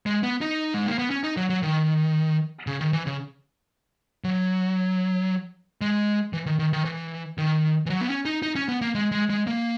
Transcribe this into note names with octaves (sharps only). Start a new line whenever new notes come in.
G#3
B3
D#4
G#3
A#3
B3
C#4
D#4
F#3
F#3
D#3
C#3
D#3
E3
C#3
F#3
G#3
E3
D#3
D#3
D#3
E3
D#3
E3
F#3
B3
C#4
D#4
D#4
C#4
B3
A#3
G#3
G#3
G#3
A#3